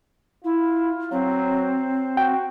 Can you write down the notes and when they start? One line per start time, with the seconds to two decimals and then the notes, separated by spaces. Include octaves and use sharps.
0.44 E4 F4
1.12 F#3 C4
2.17 F#4 G5